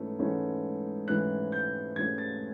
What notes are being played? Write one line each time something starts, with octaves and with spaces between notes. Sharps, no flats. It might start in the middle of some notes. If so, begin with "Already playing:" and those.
Already playing: G#2 E3 A3 C#4
G#2 E3 A3 C#4
G#2 E3 A3 C#4 F#6
G6
G#2 E3 A3 C#4 G#6
A6